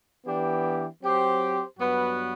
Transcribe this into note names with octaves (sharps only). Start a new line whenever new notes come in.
E3 B3 D4 G4
F#3 C4 G4 C5
G2 F#3 B3 F#4 B4